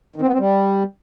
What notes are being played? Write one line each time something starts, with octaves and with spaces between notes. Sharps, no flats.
D#3
C4
B3
C4
G3